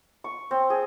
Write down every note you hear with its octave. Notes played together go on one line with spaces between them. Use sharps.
C#6
C4
G#4